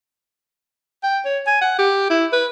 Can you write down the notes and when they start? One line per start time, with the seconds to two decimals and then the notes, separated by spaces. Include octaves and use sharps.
1.03 G5
1.25 C#5
1.47 G#5
1.62 F#5
1.78 G4
2.10 E4
2.33 B4